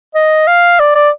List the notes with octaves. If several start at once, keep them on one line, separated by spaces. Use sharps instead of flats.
D#5
F5
D5
D5